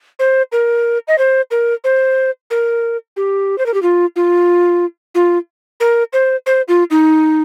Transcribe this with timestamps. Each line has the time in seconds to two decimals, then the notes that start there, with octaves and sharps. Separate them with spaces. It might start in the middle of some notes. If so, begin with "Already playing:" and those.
0.19 C5
0.52 A#4
1.08 D#5
1.18 C5
1.51 A#4
1.84 C5
2.51 A#4
3.17 G4
3.58 C5
3.66 A#4
3.74 G4
3.82 F4
4.16 F4
5.15 F4
5.80 A#4
6.13 C5
6.46 C5
6.68 F4
6.91 D#4